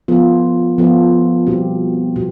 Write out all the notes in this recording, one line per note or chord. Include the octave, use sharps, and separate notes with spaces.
F3 B3 F4 A4
F3 B3 F4 A4
B2 G3 C4 G4
B2